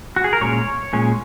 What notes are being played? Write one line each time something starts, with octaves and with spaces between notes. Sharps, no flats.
F#4
G#4
A#4
A#2 G#3 C#4 C#5
A#2 G#3 C#4